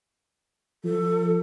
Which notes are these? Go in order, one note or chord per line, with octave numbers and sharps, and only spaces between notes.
F3 A4